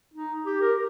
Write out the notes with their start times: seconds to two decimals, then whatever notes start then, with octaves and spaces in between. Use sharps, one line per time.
0.14 D#4
0.46 G4
0.61 A#4